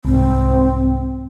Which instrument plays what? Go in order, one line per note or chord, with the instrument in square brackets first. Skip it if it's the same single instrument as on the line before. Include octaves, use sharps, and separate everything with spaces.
[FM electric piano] C2 G#2 [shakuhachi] C4